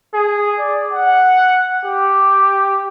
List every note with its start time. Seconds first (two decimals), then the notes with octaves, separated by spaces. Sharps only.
0.14 G#4
0.59 D5
0.92 F#5
1.85 G4